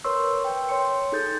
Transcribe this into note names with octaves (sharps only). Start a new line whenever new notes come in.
A#4 B4 C#5 C6 C#6 E6
B4 G5
C#5 C6 C#7
D#4 G#4 A4 G6 A6